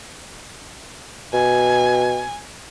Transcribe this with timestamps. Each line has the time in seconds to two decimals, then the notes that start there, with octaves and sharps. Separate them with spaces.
1.34 B2 G#5